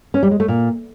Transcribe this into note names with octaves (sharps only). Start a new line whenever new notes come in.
C#4
G3
G#3
A3
A#2